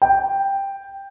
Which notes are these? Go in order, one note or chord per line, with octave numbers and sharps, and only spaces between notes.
G5